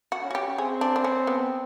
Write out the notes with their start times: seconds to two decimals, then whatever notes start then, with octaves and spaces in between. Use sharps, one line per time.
0.12 F#4
0.23 C#4
0.31 F#4
0.35 G4
0.58 C4 G#4
0.81 D4
0.96 D4
1.04 C#4
1.27 B3